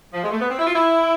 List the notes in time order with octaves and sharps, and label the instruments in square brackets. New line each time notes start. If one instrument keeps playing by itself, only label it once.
[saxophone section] F3
G#3
A3
B3
C4
E4
F4
E4